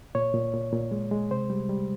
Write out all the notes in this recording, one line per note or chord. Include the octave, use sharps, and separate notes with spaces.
A#2 C#5
A#2
A#2
A#2
G#3
G#3
C3 C5
G3
G3